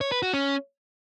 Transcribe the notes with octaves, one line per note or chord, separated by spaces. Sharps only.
C#5
B4
F#4
C#4